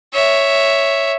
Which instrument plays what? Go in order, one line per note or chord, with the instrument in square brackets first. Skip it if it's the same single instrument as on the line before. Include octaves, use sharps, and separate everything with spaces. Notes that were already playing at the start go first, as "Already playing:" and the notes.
[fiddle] C#5 E5